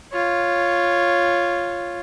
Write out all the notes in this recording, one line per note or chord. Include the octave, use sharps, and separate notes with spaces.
F4 C#5